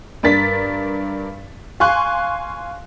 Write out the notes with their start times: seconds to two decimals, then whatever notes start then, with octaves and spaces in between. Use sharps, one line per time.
0.23 G2 D4 A#4 A6 B6
1.80 F5 G#5 C6 C#6 F#6